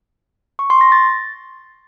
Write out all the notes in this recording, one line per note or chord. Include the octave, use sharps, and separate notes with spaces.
C#6
C6
A#6
A6